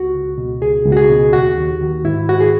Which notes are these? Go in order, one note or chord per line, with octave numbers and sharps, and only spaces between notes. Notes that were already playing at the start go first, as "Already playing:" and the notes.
Already playing: C#2 F#4
C#2
B2
C#2 G#4
C#2
F#4
G#4
B2
D#2 F#4
D#2
D#3
G#2 E4
G#2 F#4
G#4